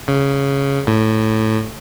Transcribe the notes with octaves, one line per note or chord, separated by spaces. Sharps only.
C#3
A2